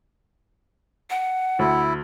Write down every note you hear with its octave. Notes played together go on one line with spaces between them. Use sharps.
F#5
D2 E4